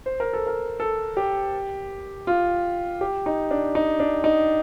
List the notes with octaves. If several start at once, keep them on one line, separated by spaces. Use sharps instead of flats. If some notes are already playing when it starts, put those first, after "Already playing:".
C5
A#4
A4
A#4
A4
G4
F4
G4
D#4
D4
D#4
D4
D#4